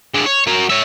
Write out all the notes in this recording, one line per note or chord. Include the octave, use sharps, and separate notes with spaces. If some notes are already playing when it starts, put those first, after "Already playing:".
G#3 D4
C#5
F#3 A#4
C#5 E5